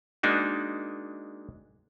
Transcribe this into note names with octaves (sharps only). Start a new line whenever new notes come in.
G#3 A#3 D4 D#4 F#4